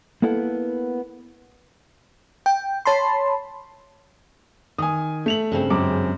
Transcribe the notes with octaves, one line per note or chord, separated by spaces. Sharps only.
A#3 B3 E4 A4 F#5
G5
C#5 A5 B5 C6
D#3 G#5 D#6
A3 F7 F#7
G2 C#3 C4
F#2 G#3 D6